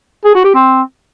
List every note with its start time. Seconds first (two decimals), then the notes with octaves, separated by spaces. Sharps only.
0.25 G#4
0.35 F#4
0.44 G4
0.54 C4